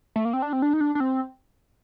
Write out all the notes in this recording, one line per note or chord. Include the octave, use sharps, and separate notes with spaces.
A3
A#3
C4
D4
C4
D4
D#4
D4
D4
C4